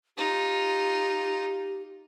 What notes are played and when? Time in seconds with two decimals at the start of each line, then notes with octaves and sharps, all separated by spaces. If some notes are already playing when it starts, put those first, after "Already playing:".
0.18 D#4 F4 G4